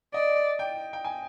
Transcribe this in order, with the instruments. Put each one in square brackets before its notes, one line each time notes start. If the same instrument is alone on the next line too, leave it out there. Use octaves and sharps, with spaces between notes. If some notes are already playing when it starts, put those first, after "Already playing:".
[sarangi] D5 [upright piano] D#5
[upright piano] G5
G5
G#5